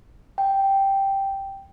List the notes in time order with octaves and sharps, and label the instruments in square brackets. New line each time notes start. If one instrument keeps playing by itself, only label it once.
[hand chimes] G5